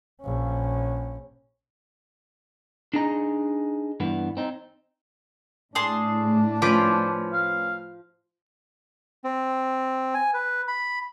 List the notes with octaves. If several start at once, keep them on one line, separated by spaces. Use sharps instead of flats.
A#1 C#4
D4 D#4 G#4 D#5 A#5
G2 E3 B3
C4 D#4
A2 D4 G#4 A5 C6
F3 C#4 B4 C5 D6
F5
C4
G#5
B4
B5